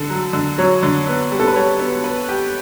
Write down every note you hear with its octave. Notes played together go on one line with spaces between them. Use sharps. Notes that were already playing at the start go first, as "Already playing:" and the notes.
Already playing: D3 A4
F#3
D3
F#3 C#5
D3
B3
G3
A4
B4
G3 C#5
B3
B4
G4